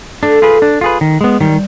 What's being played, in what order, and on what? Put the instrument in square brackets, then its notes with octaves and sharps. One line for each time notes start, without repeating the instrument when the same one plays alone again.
[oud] A3 [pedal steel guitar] D4
[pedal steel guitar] F4 G#4 B4
D4
F4 G#4 B4
D#3
G#3 B3
[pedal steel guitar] D#3 [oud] G3